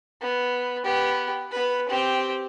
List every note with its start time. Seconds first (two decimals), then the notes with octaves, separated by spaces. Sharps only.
0.21 B3
0.84 B3 G4
1.51 B3 B4
1.89 C4 G4